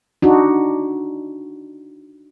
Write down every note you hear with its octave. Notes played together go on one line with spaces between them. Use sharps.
D4 D#4 F#4